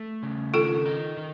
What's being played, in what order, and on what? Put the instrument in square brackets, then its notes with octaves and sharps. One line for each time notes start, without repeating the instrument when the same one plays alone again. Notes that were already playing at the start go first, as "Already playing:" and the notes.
Already playing: [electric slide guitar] A3
C#3
[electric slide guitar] D#3 [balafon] F4 A4
[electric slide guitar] D#4
D#3